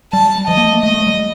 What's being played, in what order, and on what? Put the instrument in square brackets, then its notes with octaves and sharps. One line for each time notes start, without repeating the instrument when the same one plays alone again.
[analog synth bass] G3 [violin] A5
[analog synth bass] F3 [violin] D#5
[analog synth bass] A#3
A3
A#3
[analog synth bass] A3 [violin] D#5
[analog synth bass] A3
G3